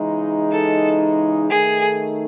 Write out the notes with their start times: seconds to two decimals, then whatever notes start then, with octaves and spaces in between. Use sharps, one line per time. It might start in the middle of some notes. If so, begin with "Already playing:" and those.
Already playing: C#3 E3 G#3 D#4
0.52 A4
1.50 D#3 A3 D#4 G#4